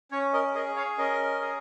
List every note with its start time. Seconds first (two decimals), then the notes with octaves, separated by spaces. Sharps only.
0.11 C#4 C#5
0.33 A#4 D#5
0.54 G#4 A#4 D#5
0.76 C#5 F5
0.98 C#4 A#4 D#5
1.41 G#4